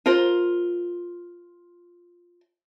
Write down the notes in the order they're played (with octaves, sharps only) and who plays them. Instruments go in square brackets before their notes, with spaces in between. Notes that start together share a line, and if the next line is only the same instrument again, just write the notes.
[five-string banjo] F4 A#4 C5